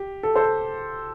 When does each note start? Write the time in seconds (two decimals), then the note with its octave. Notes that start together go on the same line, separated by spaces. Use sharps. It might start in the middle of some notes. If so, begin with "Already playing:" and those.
Already playing: G4
0.23 A4
0.36 A4 C5